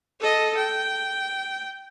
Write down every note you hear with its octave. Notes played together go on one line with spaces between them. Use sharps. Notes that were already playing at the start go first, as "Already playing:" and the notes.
A4 D#5
G5